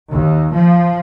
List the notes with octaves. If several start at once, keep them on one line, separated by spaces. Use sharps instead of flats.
D#2
F3